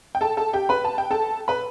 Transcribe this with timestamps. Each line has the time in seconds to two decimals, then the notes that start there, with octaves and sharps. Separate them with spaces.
0.15 G5
0.21 A4 A5
0.37 A4 A5
0.53 G4 G5
0.69 B4 B5
0.85 A5
0.98 G5
1.11 A4 A5
1.48 B4 B5